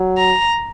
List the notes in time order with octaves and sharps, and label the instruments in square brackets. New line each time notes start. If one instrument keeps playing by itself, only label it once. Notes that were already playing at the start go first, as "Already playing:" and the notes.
Already playing: [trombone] F#3
[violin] A#5